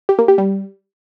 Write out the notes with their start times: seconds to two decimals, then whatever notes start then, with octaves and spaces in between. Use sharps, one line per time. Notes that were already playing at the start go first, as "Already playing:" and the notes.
0.09 G4
0.19 A#3
0.28 G4
0.38 G3